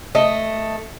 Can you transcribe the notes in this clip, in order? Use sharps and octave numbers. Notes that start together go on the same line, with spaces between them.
A3 D#5